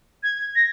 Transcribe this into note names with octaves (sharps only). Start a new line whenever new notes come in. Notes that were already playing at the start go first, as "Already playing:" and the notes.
G#6
A#6